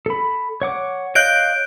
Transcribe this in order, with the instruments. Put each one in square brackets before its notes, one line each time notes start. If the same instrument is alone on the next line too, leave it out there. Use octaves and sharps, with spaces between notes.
[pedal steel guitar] A4 B5
C#5 F#5 D6
[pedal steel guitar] C#5 D#5 F5 [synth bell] F#6 G6 D7